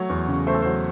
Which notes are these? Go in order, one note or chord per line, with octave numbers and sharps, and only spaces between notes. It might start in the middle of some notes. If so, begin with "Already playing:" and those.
Already playing: F#3 A3 C#5
E2
C#3
A3 C5
A4
F#3 C5